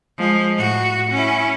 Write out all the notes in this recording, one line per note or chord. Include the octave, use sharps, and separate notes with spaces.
F3 G#3
A2 F#4
C#4 E4